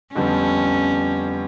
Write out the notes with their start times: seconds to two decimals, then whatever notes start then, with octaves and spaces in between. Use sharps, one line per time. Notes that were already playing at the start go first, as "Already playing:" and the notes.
0.14 F2 D3 G3 B3 C#4